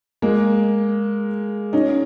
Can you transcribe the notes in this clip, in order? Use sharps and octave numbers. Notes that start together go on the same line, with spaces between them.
G#3 A#3
C#4 D#4